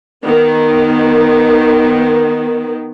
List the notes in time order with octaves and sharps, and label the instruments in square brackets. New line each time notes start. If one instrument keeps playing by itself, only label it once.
[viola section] D#3 B3